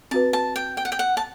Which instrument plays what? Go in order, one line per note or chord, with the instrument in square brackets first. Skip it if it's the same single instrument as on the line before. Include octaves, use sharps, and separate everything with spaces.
[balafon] C4 F#4 B4 [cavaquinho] A5
[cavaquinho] A5
G5
G5
F#5
G5
F#5
A5